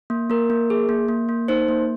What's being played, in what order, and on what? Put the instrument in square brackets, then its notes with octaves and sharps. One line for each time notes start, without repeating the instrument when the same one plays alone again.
[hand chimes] A#3
A#3 A#4
A#3
G#4
A#3
A#3
A#3
D#4 C5
A#3